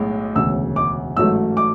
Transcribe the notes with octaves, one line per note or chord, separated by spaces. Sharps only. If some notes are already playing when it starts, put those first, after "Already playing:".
Already playing: B1 A2 G#3
E1 D2 C#3 E6
D6
A1 G#2 F#3 A3 E6
D6